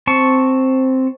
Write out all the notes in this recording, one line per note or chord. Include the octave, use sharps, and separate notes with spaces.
C4 A5 C#6